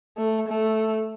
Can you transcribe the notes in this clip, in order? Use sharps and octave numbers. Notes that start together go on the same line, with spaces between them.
A3
A3